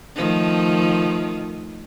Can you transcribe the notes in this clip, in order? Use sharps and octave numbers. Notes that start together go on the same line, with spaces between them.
D#3 F3 A3